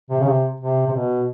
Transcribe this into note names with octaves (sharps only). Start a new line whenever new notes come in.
C3
C#3
C3
C3
C3
B2